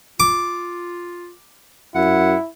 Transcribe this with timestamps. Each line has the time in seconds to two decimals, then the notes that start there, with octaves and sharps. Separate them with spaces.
0.20 F4 D6
1.95 F#2 E4 F#5